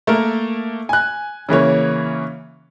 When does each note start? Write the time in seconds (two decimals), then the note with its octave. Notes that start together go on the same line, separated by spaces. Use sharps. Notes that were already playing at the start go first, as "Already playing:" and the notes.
0.07 A3 A#3 A#4
0.89 G#5 F#6
1.49 C#3 E3 A#3 C#5